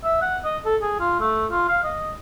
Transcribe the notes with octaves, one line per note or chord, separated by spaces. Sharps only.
E5
F#5
D#5
A4
G#4
F4
A3
F4
F5
D#5